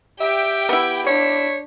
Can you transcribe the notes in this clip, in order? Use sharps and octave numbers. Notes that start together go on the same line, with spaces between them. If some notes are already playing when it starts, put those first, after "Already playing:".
G4 E5 G5
B3 E4
D4 C#5 B6